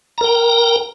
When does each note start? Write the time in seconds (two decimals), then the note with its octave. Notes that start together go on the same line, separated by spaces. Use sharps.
0.18 A#5
0.21 A#4
0.24 G5